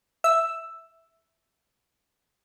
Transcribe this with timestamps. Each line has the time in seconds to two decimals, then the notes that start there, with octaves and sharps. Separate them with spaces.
0.24 E5 E6